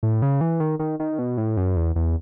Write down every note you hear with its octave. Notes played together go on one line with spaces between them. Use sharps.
A2
C#3
E3
D#3
D#3
D#3
B2
A2
F#2
E2
E2